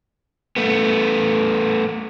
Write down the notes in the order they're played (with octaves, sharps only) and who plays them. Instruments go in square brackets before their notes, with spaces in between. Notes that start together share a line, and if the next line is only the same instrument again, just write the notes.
[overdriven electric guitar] A3 B3